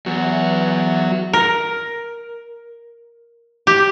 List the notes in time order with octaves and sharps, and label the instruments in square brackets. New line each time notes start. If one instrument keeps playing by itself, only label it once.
[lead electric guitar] E2 [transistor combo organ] F#3
[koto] A#4
G4